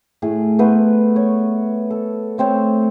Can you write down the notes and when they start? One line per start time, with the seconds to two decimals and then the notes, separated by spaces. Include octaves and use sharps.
0.22 A2 A3 G#4
0.59 A3 B3 B4 C5
1.16 C#5
1.90 A4
2.38 A3 C4 C5 C#5